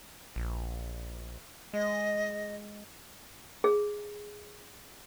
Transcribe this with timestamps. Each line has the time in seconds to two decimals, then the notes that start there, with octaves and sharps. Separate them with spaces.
0.36 A#1
1.73 G#3 D#5
3.64 G#4